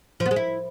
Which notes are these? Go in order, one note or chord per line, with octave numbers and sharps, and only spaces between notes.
F3
B3
G#3
E4